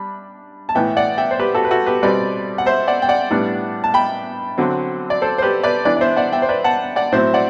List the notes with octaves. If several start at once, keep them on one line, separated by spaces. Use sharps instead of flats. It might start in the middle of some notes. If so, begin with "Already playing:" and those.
Already playing: G3 D4 B5
A5
A2 E3 B3 E5 G5
D5 F#5
E5 G5
C5
G4 B4
F#4 A4
B4
F#4 A4
G4 B4
B2 G3 C4 B4 D5
F#5
C5 E5
D5 F#5
G5
D5 F#5
A2 G3 B3 D4
A5
G5 B5
D3 F#3 C4
D5
A4 C5
C5
G4 B4
B4 D5
E3 B3 D4 B4 D5
D5
C5 E5
D5 F#5
E5 G5
C5
B4 D5
F#5 A5
D5 F#5
A2 F#3 C4 C5 E5
D5 F#5